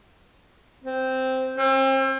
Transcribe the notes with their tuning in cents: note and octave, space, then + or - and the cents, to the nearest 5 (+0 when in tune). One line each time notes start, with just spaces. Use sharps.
C4 -5
C4 +35